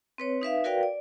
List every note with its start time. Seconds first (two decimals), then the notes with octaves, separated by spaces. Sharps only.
0.18 C4 B4 C#5
0.41 D#4 B4 E5 F5
0.64 F#4 A#4 B4 D5 F5 G5
0.83 D5